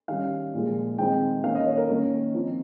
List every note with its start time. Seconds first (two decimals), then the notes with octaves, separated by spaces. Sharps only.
0.08 D#3 G3 C#4 F5
0.54 A#2 F3 G#3
0.98 D#3 G#3 C4 D#4 G5
1.44 D#3 A#3 C#4 F5
1.55 D#5
1.66 C#5
1.77 A#4
1.89 D#3 A#3 C#4
2.34 F3 C4 D#4